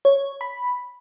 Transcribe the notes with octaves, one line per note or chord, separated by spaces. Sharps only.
C#5
B5